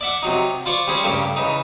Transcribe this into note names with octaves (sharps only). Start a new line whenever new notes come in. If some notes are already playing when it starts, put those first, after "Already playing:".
D5 E5 F#5
C3 F#3 D#4
F4 C5 D5 C#6
G3 C#4 G#4 C5 C#5 A5
G2 C#3 A3 A#3 C#4
C#3 E3 D#4